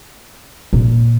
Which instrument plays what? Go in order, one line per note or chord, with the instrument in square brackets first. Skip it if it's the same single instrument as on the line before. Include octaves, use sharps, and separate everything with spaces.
[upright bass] A#2